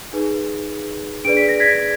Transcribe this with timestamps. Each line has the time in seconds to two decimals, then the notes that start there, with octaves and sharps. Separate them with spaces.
0.13 D#4 G#4 B4
1.25 D4 G#4 B4 D5 D7
1.37 B6
1.49 A#6
1.60 G#6 B6